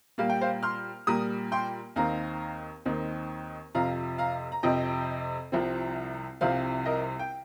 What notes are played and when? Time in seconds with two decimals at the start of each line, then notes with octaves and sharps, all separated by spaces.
0.18 A#2 G3 A#3 F5
0.30 G5
0.41 C5 F5
0.63 C6 F6
1.07 A#2 G3 A#3 A#5 D#6
1.52 G5 C6
1.96 D#2 D#3 C4 F5 A#5
2.86 D#2 D#3 C4
3.75 F2 C3 F3 F5 A#5
4.18 F5 A#5
4.52 A#5
4.63 F2 C3 F3 D#5 G5
5.52 C2 C3 F3 C4
6.41 C2 C3 F3 C4 C5 F5
6.85 A#4 D#5
7.19 G5